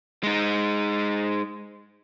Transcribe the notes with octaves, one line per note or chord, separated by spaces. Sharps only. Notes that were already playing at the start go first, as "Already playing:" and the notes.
G#3 D#4